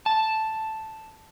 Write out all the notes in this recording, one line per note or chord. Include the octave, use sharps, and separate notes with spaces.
A5